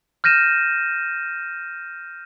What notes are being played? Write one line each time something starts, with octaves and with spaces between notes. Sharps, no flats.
F6 G6 A#6 D#7 E7